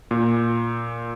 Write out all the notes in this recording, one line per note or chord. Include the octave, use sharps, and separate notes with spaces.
A#2